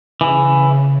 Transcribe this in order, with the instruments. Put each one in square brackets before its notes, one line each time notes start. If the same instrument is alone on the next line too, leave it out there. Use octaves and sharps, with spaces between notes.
[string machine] C#3 [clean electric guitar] E3